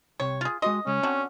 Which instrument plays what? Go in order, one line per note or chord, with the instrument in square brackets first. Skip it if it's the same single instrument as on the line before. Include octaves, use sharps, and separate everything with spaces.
[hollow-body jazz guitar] C2 C3 [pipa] C#5
[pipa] F4 G#4
[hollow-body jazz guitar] G#3 F#4 C6 [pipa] D#5
[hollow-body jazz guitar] C#3 G#3 [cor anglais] C#4
[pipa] D3 F#4 [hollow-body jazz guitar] C4